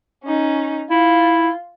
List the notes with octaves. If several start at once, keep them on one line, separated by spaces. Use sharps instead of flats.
C#4 D#4
E4 F4